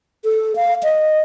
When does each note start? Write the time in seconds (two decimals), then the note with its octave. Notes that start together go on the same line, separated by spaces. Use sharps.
0.25 A4
0.56 F5
0.83 D#5